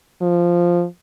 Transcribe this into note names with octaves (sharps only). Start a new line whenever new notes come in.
F3